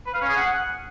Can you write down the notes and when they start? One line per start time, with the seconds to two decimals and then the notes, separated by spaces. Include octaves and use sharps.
0.06 B4
0.14 F5
0.21 C#4
0.29 G#4
0.36 F#5